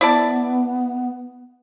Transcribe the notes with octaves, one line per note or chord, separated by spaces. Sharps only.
B3 E4 D5 A5